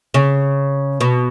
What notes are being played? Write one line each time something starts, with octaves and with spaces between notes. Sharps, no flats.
C#3
B2